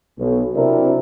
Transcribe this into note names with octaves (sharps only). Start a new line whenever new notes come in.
B1
C3 F#3 C4 D4 E4 A#4